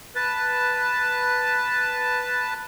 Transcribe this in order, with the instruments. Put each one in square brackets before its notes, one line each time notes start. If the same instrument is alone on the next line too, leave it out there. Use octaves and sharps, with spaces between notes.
[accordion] B4 A5